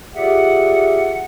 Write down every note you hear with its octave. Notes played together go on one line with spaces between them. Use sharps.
F4 G4 G#4 D5 E5 F#5